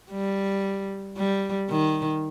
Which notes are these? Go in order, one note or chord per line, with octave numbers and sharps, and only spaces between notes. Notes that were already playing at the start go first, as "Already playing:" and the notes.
G3
G3
D#3